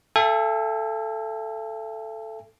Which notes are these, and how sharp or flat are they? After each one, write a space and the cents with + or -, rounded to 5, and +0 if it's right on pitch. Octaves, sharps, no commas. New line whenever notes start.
A4 +0 E5 +40 G#5 -45